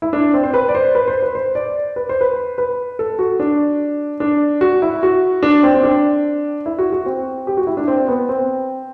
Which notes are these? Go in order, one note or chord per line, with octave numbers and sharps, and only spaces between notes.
E4
D4
C4
C5
B4
D5
C5
B4
C5
B4
C5
D5
B4
C5
B4
B4
A4
F#4
D4
D4
F#4
E4
F#4
D4
C4
C4
D4
E4
F#4
F#4
C4
G4
F#4
E4
D4
C4
B3
C4